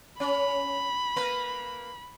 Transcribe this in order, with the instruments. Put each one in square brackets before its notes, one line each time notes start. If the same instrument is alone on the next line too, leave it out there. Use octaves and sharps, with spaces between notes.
[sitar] C#4 [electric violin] B5
[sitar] A#3 A#4 B4